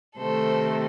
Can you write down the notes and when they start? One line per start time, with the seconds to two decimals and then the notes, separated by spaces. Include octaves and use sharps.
0.19 C3 D#3 A3 A4 C5